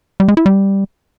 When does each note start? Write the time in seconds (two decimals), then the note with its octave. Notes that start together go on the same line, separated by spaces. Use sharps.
0.20 G3
0.28 G#3
0.37 E4
0.46 G3